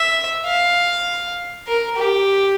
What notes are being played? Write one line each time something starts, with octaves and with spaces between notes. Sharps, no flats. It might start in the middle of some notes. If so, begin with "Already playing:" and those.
Already playing: E5
F5
A#4
G4